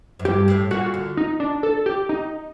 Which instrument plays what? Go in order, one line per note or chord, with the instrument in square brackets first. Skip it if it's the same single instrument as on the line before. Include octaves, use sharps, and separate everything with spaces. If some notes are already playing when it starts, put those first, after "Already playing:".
[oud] F#2
[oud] G2 [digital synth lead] G4
[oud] A2
[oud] A#2 [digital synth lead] F#4
[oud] D3
[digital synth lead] D#4
D4
A4
G4
D#4